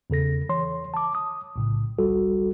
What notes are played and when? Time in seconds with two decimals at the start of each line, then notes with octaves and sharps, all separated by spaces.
0.10 E2 C#3 A4 A#6
0.49 E3 C#5 C6
0.94 A5 D6
1.15 D#6
1.56 B1 A2 C#3
1.99 G1 C2 G3 F#4 A4